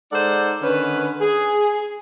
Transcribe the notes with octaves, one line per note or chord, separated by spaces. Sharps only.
G#3 D#4 A4 C5 D5 F#5
D3 D#3 C#4 B4
G#4